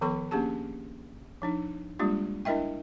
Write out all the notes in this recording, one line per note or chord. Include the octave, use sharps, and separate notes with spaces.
D#3 F3 B3 A4 B5 C#6
A#3 C#4 D4 G4 G#4 A5
F3 D4 D#4
G3 G#3 A#3 D4 F4 G4
D4 E4 A#4 D#5 E5 G5